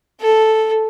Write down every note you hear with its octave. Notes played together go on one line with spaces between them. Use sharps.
A4